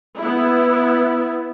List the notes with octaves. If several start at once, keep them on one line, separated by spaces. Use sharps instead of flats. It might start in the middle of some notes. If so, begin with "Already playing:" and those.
B3 E4